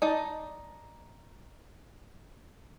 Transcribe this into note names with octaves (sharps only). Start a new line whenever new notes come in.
D#4 D5 A5